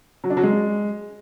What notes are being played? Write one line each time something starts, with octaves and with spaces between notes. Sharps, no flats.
F#3
D4
F#3
G#3